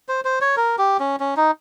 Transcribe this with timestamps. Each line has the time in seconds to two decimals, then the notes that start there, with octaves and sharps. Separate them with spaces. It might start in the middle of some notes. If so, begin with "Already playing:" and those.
0.09 C5
0.25 C5
0.41 C#5
0.57 A#4
0.78 G4
1.00 C#4
1.20 C#4
1.37 D#4